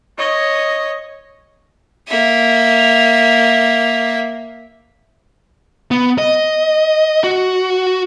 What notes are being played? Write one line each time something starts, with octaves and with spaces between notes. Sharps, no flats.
C#5 D#5
A#3 E5
B3
D#5
F#4